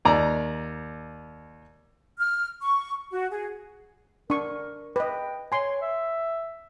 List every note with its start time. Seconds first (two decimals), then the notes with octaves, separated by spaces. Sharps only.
0.05 D#2 D5 A#5
2.20 F6
2.61 C#6
3.11 F#4
3.31 G#4
4.30 D4 A#4 C#6
4.96 B4 D#5 G5
5.52 C#5 G#5 C6
5.82 E5